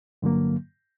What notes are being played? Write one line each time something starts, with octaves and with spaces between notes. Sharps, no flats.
G2 D3 F#3 A#3